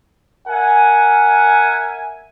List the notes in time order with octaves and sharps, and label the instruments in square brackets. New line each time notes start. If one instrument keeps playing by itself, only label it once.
[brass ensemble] A#4 E5 F#5 G#5